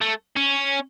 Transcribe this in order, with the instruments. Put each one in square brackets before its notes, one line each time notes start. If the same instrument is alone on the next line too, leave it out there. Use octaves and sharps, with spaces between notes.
[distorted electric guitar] A3
C#4